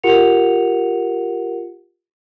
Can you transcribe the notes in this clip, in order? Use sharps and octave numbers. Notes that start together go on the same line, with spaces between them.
F4 G4 A#4 F#5 C#7 F7